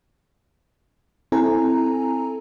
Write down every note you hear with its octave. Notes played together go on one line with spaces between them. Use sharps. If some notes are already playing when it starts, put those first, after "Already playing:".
C4 E4 A4 G#5 A#5